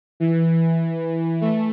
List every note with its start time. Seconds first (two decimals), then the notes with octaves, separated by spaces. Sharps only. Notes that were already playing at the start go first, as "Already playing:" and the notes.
0.20 E3
1.41 A3